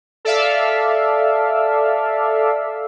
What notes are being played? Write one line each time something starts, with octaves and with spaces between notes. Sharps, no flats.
A4 D5 E5 F5